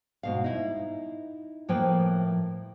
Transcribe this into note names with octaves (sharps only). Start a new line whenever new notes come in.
G#2 B2 F5
D#4 E4
A2 F3 A#3 B4 G5